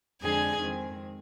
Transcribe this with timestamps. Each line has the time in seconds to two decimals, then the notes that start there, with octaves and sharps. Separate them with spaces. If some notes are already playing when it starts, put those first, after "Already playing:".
0.22 F2 D3 G#3 D4 G#4 G#5
0.59 F2 D#3 G#3 C4